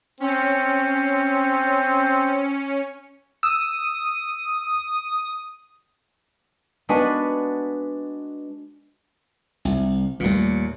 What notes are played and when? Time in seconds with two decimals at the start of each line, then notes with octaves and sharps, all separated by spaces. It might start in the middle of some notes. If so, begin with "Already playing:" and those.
0.20 C4 C#4 C#7
3.43 D#6 E6
6.89 G#3 B3 D4 F#4 B4 G#5
9.65 C2
10.20 D#2 A#2 G3 A3